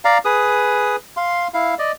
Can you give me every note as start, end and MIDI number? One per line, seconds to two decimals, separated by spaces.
0.05 0.18 74
0.05 0.18 77
0.05 0.18 82
0.25 0.96 68
0.25 0.96 71
0.25 0.96 87
1.17 1.48 77
1.17 1.48 84
1.54 1.75 64
1.54 1.75 77
1.79 1.92 74
1.79 1.92 75